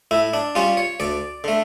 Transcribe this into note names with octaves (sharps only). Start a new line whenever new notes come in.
A2 E4
D4
G3 C#4 F4
C#5
D2 D5
D3 A3